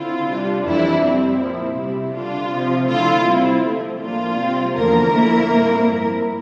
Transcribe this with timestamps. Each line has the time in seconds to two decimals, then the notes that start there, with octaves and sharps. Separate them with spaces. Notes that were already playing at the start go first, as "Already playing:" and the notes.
Already playing: D3 C4 E4 F4
0.26 C3 G3 D4
0.64 F2 E3 G3 D4 E4
1.01 C3 G3 C4 E4
1.39 A#2 F3 C4 E4
1.76 C3 G3 C4 E4
2.13 D3 G3 D4 F4
2.51 C3 F3 C4
2.87 D3 F3 A3 E4 F4
3.25 C3 G3 C4 E4
3.62 C3 F3 A3 C4 E4
3.99 A2 F3 A#3 D4 F4
4.37 C3 G3 C4
4.74 E2 D3 F3 A3 A#3 A#4
5.12 D3 F3 A3 E4
5.49 A2 G3 C4 E4
5.86 G2 F3 A#3 E4